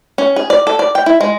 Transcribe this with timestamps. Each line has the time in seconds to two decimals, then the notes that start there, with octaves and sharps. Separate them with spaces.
0.18 C#4
0.36 G#4
0.50 D5
0.67 A4
0.79 D5
0.95 G5
1.06 E4
1.21 G#3